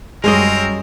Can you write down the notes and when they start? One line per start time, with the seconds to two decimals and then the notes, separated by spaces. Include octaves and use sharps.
0.24 F#2 G3 G#3 C4 C#4 A#4 D#5